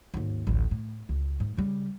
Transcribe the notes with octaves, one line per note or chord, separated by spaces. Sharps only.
G#1 D#2
A1 D2
A2
C#2
G#2
C#3 G3